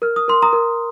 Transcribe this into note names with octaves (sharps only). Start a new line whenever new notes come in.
A#4 F6
D#6
A#4 C6
A#5 D#6
A#4